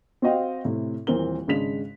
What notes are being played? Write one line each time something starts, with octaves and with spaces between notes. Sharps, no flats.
C4 F#4 C5 D#5 F5 G5
A2 C3 E4
D#1 E3 C4 A#4 G7
G#1 C#3 G#3 D4 B6 F7